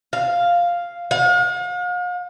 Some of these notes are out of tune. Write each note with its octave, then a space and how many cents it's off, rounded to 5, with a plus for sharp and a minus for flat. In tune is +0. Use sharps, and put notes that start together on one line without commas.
F5 +0
F5 +45